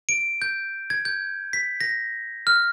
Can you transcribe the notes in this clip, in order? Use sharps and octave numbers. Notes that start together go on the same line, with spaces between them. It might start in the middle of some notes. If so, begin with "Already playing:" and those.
D7
G6
G#6
G6
B6
A#6
F6